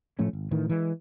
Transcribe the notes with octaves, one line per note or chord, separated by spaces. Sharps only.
A2 F3 A3 C#4
G#1
A2 D#3 E3
E3 G#3